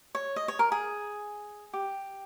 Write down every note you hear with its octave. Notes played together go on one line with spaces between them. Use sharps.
C#5
D#5
C#5
A#4
G#4
G4